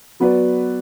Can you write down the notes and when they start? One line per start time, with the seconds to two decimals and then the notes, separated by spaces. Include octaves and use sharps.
0.20 F#3 B3 F#4 B4 D5